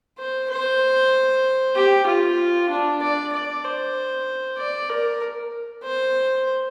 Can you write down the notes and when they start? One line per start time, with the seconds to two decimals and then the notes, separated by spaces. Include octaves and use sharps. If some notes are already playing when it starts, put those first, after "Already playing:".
0.18 C5
0.50 C5
1.76 G4
2.07 F4
2.70 D4
3.01 D5
3.33 D5
3.64 C5
4.58 D5
4.90 A#4
5.84 C5